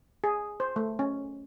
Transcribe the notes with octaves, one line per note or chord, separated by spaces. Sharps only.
G#4
C5
A3
C#4